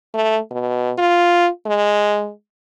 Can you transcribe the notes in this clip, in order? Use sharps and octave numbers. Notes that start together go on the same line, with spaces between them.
A3
B2
F4
G#3